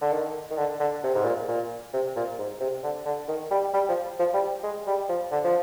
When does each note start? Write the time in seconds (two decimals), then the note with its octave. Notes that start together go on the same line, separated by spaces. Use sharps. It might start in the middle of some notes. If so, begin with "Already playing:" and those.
0.01 D3
0.12 D#3
0.51 D#3
0.58 D3
0.80 D3
1.03 C3
1.15 G#2
1.25 A#2
1.48 A#2
1.94 C3
2.16 A#2
2.39 G#2
2.61 C3
2.83 D3
3.06 D3
3.28 D#3
3.51 G3
3.74 G3
3.89 F3
4.19 F3
4.34 G3
4.63 G#3
4.87 G3
5.09 F3
5.32 D3
5.44 F3